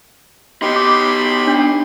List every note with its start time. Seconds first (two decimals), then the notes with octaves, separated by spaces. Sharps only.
0.62 B3 D#4 G4 B5 C6
0.76 D6
1.47 D4